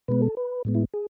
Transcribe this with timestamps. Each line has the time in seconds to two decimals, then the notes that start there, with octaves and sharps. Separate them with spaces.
0.08 B2 G#3 B3 B4
0.22 A4
0.37 B4
0.65 A2 G#3 B3
0.75 E4
0.94 G#4